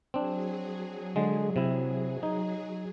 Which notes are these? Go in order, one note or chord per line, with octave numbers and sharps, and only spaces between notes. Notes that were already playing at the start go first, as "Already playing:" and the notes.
F#3 C4 D4 G#4
D3 G#3
C3 E4
D#4